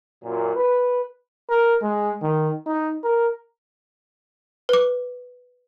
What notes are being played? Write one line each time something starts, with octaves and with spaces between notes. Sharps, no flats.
F#2 A#2
B4
A#4
G#3
D#3
D#4
A#4
B4 D6